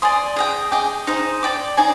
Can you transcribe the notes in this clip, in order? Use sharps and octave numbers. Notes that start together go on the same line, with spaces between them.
D5 G#5 C6 D#6
G#4 D#5 G5
G#4 D#5 G5 D6
D#4 G#4 C5
D5 G5 D6
D#4 G#4 D5 G#5